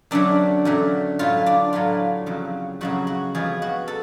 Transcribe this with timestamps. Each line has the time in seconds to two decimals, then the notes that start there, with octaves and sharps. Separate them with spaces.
0.11 F#2 D3 F#3 A3 D4
0.65 F#2 D3 F#3 A3
1.19 A2 F#3 A3 F4
1.46 D4
1.73 A2 F#3 A3 F4
2.26 F2 C#3 F#3
2.81 F2 C#3 F#3 F#4
3.07 F#4
3.35 F2 F3 G#3 B3 G#4
3.62 F#4
3.88 A4